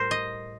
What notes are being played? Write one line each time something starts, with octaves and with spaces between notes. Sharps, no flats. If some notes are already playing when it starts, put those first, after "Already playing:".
Already playing: A2 G3 A#4 C5
D#5